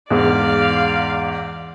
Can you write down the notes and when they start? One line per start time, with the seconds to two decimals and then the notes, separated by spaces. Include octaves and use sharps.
0.11 E2 G#2 D5 F5